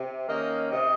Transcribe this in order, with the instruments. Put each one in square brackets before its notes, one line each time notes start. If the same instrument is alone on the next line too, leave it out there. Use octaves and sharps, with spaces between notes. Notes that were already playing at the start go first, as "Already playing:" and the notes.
Already playing: [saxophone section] C3
D#3 A#3 C#4 D#5
C3 D#5